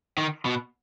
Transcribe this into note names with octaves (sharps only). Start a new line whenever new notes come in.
D#3
B2